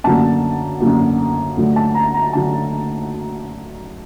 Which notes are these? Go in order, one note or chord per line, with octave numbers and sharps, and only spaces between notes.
F#2 D3 F#3 A#3 A5
F#2 D3 F#3 A#3
D2 D3 F#3
A5
A#5
A#5
D3 F#3 A5